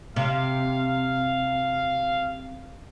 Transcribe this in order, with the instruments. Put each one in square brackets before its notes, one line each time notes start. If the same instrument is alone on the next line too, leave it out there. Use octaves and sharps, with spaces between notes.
[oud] C3 [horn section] F5